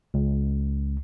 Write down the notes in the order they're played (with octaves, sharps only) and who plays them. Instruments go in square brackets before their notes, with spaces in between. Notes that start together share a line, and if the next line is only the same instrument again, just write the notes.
[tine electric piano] C#2